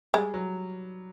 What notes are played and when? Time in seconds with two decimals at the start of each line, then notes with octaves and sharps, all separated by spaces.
0.14 G3 G#3
0.34 F#3